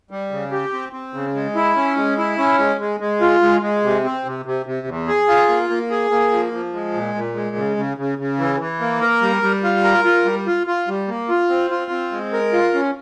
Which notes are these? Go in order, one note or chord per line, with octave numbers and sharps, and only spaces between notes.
G3
C#3
G4
C4
C4
C#3
G#3
E4
C#4
G#3
E4
C#4
G#3
G#3
G#3
F4
G#3
G#3
C3
C4
C3
C3
C3
E2
G#4
F4
A#3
A#3
G#4
A#3
F3
F3
G#3
A#2
A#2
G#3
C#3
C#3
C#3
C#3
E3
E3
A#3
A#4
G3
G3
F4
A#4
F4
G3
F4
F4
G3
A#3
F4
C4
F4
C4
G#3
A#4
F4
C#4